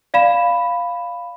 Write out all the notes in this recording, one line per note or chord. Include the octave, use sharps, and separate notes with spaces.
D5 F5 B5 E7